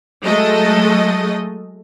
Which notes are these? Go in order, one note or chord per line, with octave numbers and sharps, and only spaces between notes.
F#3 G#3 A3 A4 D#5